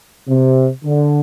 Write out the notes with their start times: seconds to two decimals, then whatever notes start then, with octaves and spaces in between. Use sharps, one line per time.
0.29 C3
0.85 D3